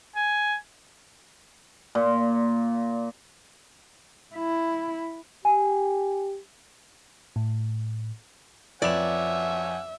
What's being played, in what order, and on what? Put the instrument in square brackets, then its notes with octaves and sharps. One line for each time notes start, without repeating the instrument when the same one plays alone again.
[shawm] G#5
[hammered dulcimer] A#2
[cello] E4
[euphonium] G4 [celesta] G#5
[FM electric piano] A2
[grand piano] F2 B4 E7 [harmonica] C#5 F#5 G#5 [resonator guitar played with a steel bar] D5 [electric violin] E5